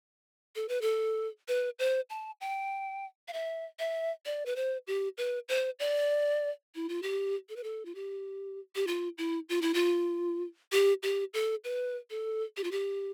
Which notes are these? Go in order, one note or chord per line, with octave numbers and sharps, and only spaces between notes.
A4
B4
A4
B4
C5
A5
G5
F5
E5
E5
D5
B4
C5
G4
B4
C5
D5
E4
F4
G4
A4
B4
A4
F4
G4
G4
F4
E4
F4
E4
F4
G4
G4
A4
B4
A4
G4
F4
G4